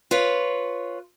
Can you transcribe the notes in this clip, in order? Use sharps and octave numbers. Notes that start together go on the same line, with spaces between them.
F4 B4 C#5